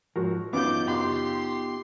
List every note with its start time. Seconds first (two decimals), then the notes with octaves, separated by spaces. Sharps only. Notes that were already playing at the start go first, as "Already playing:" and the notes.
0.16 G#2 F3 F#3 F#4 A#4
0.53 F#2 E3 F#3 B3 D#4 F4 D6 G6
0.88 F#2 C#3 G4 C6